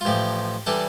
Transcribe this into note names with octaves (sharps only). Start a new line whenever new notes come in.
F4
A1 A2 F3 G4
E3 G3 D4 A4